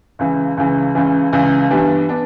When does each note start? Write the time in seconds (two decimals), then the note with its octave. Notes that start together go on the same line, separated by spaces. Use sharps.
0.19 C#2 C#3 E3
0.57 C#2 C#3 E3
0.95 C#2 C#3 E3
1.33 C#2 C#3 E3
1.70 G2 E3 G3 B3 D4
2.09 B3 D4